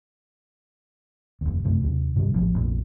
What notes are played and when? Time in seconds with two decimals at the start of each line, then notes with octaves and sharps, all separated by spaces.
1.41 F1 D#2
1.64 F#2 C3 A3
1.81 D#2 C3
2.16 G2 C3 D#3 G3
2.33 E1 A1 F3
2.54 F1 A#1 A#2